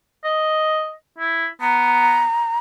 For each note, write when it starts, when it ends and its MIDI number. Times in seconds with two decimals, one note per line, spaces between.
0.24 0.92 75
1.18 1.47 64
1.61 2.23 59
1.61 2.58 82